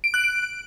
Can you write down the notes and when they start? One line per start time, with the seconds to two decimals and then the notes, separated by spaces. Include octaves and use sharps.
0.04 D7
0.14 F#6
0.24 D7